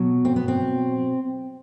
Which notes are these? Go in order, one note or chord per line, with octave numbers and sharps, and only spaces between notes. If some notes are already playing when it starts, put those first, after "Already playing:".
Already playing: B2 F#3
C4
B3
C4